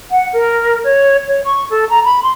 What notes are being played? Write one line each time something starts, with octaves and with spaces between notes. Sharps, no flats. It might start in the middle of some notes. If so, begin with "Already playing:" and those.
F#5
A#4
C#5
C#5
C#6
A4
A#5
B5
C6